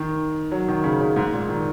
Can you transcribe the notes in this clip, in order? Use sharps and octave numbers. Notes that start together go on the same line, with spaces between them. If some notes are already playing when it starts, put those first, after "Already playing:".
Already playing: D#3
F#3
D#3
C#3
C#3
G#2
A#2
D#3